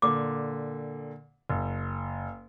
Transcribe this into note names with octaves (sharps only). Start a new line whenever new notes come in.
A#2 D3 D6
F#1